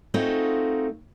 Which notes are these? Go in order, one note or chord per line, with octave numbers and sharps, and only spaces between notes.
A3 C4 D#4 F4 F#4 G#4